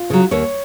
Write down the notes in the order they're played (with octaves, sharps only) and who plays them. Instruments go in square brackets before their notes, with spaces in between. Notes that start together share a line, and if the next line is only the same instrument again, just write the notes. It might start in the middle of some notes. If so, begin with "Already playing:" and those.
Already playing: [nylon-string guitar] F4
C#3 F#3
D#2 C#5